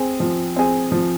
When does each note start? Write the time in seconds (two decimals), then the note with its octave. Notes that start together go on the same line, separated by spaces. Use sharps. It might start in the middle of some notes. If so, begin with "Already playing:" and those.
Already playing: C4 G#4
0.20 F3
0.56 C4 G#4
0.92 F3